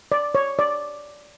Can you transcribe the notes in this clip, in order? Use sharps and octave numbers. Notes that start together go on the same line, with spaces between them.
D5
C#5
D5